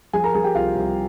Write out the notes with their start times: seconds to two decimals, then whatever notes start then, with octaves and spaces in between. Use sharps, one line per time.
0.13 F3 G#4 G#5
0.24 A#4 A#5
0.34 F3 G#4 G#5
0.44 G4 G5
0.54 C2 F4 F5
0.75 C2